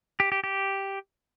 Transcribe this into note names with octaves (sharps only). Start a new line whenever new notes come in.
G4
G4
G4